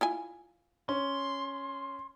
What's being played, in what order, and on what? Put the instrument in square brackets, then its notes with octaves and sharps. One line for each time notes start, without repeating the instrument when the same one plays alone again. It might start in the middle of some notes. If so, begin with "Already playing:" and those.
[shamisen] E4 F4 G#5
[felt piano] C#4 [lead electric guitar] C6